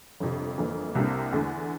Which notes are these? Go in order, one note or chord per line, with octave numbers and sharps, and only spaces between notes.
G1 F2 C3
G1 F2 E3 A#3
C2 C3 G3 A#3 D4
E2 D3 A3